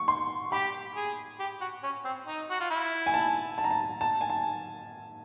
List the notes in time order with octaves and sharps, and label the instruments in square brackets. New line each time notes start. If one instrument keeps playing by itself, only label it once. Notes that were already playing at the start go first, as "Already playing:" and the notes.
Already playing: [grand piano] C#6
C6
[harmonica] G4 [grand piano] B5
[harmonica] G#4
G4
F#4
C#4
C4
D#4
F#4
F4
E4
[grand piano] G#5
A5
A5
A#5
A5
A5
G#5
A5